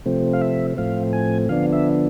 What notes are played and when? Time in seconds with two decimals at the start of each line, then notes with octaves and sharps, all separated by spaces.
0.06 C3 F3 A3 C4
0.33 F5
0.42 E5
0.77 A2 F3 A3 C4 F5
1.13 G#5
1.49 D3 F3 B3 D4 F5
1.73 E5